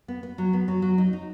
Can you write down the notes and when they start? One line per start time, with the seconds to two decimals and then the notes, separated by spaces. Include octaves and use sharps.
0.08 B3
0.23 B3
0.38 F#3
0.53 B3
0.68 F#3
0.82 F#3
0.98 D#4
1.13 D#4